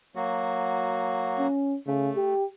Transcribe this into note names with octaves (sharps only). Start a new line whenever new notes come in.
F#3 A#3 F#4
C#4
C#3 A3
G4